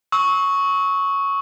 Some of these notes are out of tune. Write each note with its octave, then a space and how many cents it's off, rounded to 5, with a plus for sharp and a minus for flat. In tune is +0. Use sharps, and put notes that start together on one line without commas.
C#6 +0 E6 -35